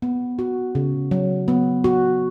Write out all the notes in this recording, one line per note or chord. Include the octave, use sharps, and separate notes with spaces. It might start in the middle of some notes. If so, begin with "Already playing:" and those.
B3
F#4
C#3
F#3
B3
F#4